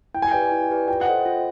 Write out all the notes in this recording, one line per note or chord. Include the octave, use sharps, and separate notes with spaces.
E4 G5
G#5
G4 B4 D5 G5
E4
G4 B4 D5
F4 G5
F#5
A4 C5 D#5 G5
F4